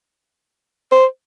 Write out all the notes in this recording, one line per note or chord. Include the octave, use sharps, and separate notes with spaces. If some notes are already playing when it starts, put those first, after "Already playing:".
C5